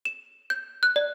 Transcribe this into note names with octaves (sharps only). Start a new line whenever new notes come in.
E7
G6
F#6
D5